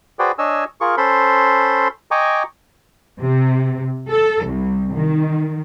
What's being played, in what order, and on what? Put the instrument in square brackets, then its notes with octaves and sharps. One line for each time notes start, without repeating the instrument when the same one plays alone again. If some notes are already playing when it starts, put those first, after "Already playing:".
[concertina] F#4 G#4 B4 C5 D5 G5
D4 C#5 D#5 G#5 E6
F4 G#4 A#4 C#6
C#4 A4 C5 B5 C6
D#5 G5 G#5 A#5 C#6 D6
[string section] C3
A4
C2
D#3